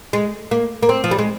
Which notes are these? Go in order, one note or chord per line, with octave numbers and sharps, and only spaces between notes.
G#3
A#3
A#3
C4
F3
G3
G#3